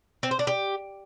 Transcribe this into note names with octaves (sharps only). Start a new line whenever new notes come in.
C4
C5
D4
G4